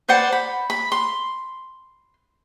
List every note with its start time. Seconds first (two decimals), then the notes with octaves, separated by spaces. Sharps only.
0.08 B4 C5 D5 F#5
0.32 B5
0.70 B5
0.92 C6